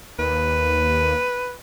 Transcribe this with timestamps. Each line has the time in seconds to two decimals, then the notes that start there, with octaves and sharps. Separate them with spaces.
0.19 D#2 B4